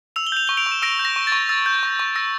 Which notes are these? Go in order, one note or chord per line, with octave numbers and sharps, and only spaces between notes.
E6 F7
G7
G6 F7
C#6 G7
D7 F7
C#6
E7
E6 A#6 D7
G6
A#6
C#6
A6
C#6
E6 A6
G6
C#6
C#6
E6 A#6